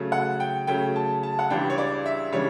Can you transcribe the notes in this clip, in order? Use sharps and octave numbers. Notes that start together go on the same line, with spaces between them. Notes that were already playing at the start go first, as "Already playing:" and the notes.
Already playing: C#3 F#3 A3
F#5
G5
C#3 F#3 A3 G5
A5
A5
F#5
C#2 C#3 E3 G3 D4 G5
C#5
D5
E5
C#3 E3 G3 D4 C#5